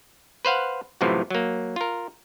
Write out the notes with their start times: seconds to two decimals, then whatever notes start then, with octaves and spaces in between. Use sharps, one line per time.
0.45 B4 C5 F5 F#5
1.01 F#2 A2 C3 E3 F3
1.31 F#3 A#3
1.76 F4 A#4